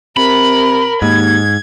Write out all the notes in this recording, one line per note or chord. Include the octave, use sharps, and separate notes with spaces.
C3 A#4 B5
D#2 G#2 G#6